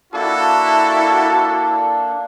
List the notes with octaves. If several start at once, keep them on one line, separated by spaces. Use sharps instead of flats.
A#3 D4 E4 F#4 A4